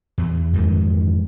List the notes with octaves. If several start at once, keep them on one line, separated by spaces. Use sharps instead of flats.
E2
F2 G#2 D#3 E3